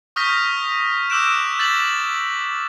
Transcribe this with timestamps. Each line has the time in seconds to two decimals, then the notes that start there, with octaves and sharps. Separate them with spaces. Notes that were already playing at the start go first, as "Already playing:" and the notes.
0.16 C#6 D#6 F6 G6 A#6 B6
1.10 D6 E6 F#6 G6 D7 E7
1.59 G6 A6 B6 F#7